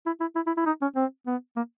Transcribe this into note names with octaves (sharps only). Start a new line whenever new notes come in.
E4
E4
E4
E4
E4
D#4
C#4
C4
B3
A#3